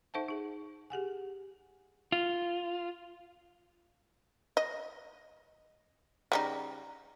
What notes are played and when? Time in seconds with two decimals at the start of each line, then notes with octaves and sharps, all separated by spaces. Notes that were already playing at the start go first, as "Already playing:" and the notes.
0.14 D#4 A4 C5 E5 F#5 A5
0.29 D#4 G#4
0.90 G4 G#4 F#5 G#5
2.12 F4
4.57 D#5
6.32 C#3 G3 D#4